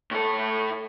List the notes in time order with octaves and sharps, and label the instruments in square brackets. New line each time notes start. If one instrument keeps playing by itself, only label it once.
[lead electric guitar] A2 A4